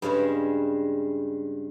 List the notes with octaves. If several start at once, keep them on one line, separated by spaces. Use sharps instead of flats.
G2 C#3 G3 G#3